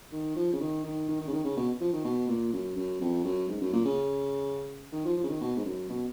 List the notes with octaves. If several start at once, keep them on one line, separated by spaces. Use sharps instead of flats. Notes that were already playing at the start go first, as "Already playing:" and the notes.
D#3
F3
C#3
D#3
D#3
D#3
D#3
C#3
D#3
C#3
B2
F3
D#3
B2
A#2
F#2
F#2
F2
F#2
G#2
F#2
A#2
C#3
D#3
F3
F3
C#3
D#3
B2
G#2
F#2
B2